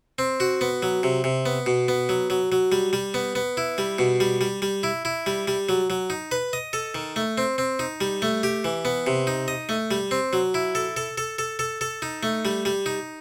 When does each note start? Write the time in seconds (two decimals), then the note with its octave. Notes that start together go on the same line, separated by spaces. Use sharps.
0.19 C4
0.40 F#4
0.61 B3
0.82 F#3
1.03 C3
1.24 C3
1.46 B3
1.66 B2
1.88 B3
2.09 F#3
2.30 F#3
2.52 F#3
2.72 G3
2.93 G3
3.14 B3
3.35 B3
3.57 E4
3.78 G3
3.99 B2
4.20 G3
4.41 G3
4.62 G3
4.83 E4
5.05 E4
5.26 G3
5.48 G3
5.69 F#3
5.90 F#3
6.10 D#4
6.32 B4
6.53 D#5
6.73 A4
6.95 D#3
7.16 A3
7.38 C4
7.58 C4
7.79 D#4
8.01 G3
8.22 A3
8.43 G4
8.64 E3
8.85 B3
9.07 C3
9.27 D#4
9.48 D#5
9.69 A3
9.91 G3
10.11 C4
10.33 F#3
10.54 E4
10.75 A4
10.97 A4
11.18 A4
11.39 A4
11.59 A4
11.81 A4
12.02 D#4
12.23 A3
12.45 G3
12.65 G3
12.86 D#4